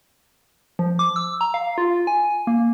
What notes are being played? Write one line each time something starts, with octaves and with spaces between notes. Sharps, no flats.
F3
D6
E6
A#5
F5
F4
G#5
A#3